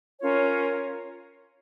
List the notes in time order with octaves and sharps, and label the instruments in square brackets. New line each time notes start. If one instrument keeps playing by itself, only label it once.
[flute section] C#4 F4 A#4 C#5